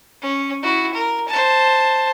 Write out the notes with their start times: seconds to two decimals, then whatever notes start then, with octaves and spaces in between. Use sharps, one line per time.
0.22 C#4
0.63 E4 F#4
0.94 A#4
1.28 C5 A5